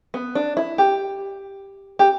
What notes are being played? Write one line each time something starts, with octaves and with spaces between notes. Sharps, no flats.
B3
D4
E4
G4
G4